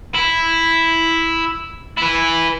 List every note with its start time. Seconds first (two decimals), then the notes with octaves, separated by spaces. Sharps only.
0.14 E4
1.97 E3 E4